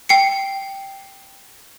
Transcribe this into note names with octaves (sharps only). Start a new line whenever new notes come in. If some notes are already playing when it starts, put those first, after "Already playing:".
G5 C7 C#7